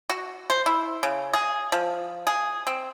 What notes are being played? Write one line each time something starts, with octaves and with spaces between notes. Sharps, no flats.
F#4
C5
E4
C#3
G#4
F3
G#4
C4